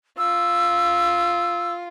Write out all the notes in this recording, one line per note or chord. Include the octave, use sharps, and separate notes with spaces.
F4 E6